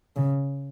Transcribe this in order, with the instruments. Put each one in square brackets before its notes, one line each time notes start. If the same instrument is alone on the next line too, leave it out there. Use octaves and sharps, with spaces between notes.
[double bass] C#3